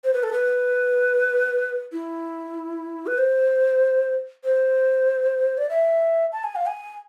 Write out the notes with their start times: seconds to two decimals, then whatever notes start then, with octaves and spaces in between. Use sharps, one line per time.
0.04 C5
0.13 B4
0.23 A4
0.33 B4
1.92 E4
3.07 B4
3.18 C5
4.44 C5
5.58 D5
5.70 E5
6.32 A5
6.44 G#5
6.56 F5
6.66 G#5